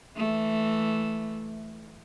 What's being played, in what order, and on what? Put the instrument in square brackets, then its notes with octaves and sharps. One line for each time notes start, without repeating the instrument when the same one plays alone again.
[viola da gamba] E3 A3